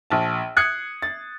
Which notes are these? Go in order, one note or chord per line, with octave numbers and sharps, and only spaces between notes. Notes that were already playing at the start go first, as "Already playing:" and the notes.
A#1 A5
D#6 F#6 G#6 C7 C#7
A6